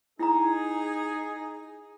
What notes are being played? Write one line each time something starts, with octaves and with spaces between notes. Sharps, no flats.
D#4 E4 G#4 A#5